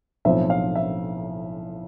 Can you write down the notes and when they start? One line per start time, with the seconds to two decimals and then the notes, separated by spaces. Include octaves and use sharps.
0.25 B1 A2 F3 C4 E5
0.50 F5
0.75 E5